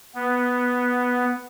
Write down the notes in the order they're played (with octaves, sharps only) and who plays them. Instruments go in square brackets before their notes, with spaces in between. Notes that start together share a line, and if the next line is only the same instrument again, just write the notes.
[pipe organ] B3